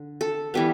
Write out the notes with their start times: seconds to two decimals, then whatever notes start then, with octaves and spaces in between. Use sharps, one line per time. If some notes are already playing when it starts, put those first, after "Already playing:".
Already playing: D3
0.21 A4
0.54 E3 G3 B3